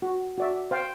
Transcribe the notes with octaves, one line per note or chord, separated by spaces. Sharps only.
F#4
F#4 D5 E5
C5 F5 G5